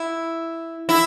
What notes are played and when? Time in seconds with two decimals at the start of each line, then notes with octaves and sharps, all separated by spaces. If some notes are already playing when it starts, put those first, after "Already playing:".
Already playing: E4
0.89 E4